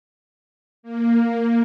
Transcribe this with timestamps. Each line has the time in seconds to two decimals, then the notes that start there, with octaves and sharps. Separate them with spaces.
0.83 A#3